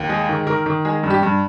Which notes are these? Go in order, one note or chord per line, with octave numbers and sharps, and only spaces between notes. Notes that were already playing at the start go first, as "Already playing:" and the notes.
Already playing: D#2
G#3 G#4
D#3
D#3 A#4
D#3
G#3 G#4
G2
G4
G2